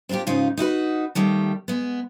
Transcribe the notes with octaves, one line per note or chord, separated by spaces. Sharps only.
C4 D4 D#4 F4 G4
G#2 C#3 D#4 F4
D#4 E4 F#4 B4
D#2 D#3 G3 A3
G#3 B3